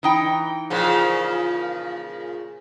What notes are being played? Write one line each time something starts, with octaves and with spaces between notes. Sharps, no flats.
E3 D#4 G5
A#2 C#3 F3